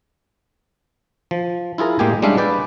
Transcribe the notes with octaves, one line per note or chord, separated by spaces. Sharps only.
F3
E4 F4 G#4 A#4
A2 G#3 A#3 G4 G5 G#5
G3 G#3 C#4 D4 E5 F5
B4 D5 G5